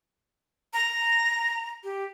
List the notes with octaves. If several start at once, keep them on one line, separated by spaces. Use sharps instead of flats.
A#5
G4